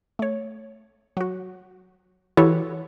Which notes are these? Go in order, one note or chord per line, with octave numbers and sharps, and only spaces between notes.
A3 C#5
F#3 F#4
E3 E4 F#4 G4 A4 C#5